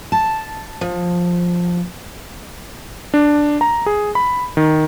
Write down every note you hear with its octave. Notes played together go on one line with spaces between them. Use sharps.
A5
F3
D4
A#5
G#4
B5
D#3